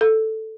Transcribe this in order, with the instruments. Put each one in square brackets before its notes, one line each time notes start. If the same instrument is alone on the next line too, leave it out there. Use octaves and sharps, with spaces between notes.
[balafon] A4